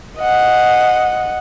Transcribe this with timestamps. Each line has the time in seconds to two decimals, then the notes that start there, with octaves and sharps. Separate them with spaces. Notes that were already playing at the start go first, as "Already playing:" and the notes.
0.18 D#5 F#5